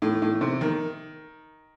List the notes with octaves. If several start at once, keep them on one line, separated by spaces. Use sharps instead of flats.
A2
A2
C3
D#3